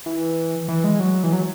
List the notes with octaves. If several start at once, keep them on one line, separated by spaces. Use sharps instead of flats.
E3
E3
G#3
F#3
E3
F#3